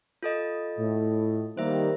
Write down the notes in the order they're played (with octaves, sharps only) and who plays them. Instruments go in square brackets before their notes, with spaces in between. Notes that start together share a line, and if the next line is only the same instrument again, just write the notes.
[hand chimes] F4 A4 D#5
[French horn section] A2
[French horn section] D#3 G3 A#3 [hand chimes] C5 E5